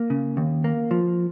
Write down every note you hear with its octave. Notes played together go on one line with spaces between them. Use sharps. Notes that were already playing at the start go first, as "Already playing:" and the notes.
Already playing: A#3
C#3
D#2
A#3
F3